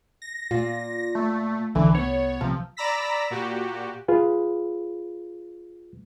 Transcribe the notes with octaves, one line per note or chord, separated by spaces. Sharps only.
A#6
A#2 F4
A3
C2 D3 E3
B3 C#5
C3 F3
D5 A#5 B5 E6 A#6 B6
A#2 F#4 G4
F4 G#4 B4